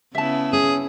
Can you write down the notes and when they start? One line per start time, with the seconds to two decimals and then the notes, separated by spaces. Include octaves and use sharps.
0.15 C#3 B3 E4 E5 A5
0.53 C#4 G#4